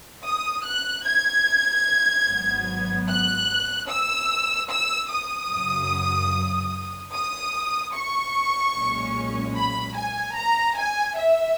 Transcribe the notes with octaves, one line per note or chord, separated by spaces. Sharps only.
D#6
F#6
G#6
G#1 G#2 F#3 B3
F#6
E6
E6
D#6
F#2 C#3 F#3
D#6
C#6
B1 A#2 G#3 C#4
B5
G#5
A#5
G#5
E5